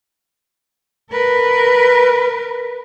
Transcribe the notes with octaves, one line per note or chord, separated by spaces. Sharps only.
A#4 B4